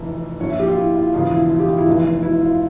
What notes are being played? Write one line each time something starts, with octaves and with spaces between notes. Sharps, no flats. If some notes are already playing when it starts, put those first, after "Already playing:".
Already playing: F1 F2 E3
A#1 A#2 F3 C#5
E5
G4
F4
E4
F4
E1 E2 C#3 F3 F4
E4
F4
G4
F4
E4
F1 E2 E3
E4
F4